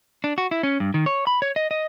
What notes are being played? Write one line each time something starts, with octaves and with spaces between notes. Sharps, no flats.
D4
F#4
E4
C#4
G2
D#3
C#5
B5
C#5
D#5
D#5